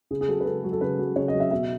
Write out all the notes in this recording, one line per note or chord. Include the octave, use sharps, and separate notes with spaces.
C#3 G#4
G#4
F#3 A4
B4
C#3 A4
F#3
A4
C#3 B4
F#3
C#3 C#5
D#5
F#3
E5
B2 E5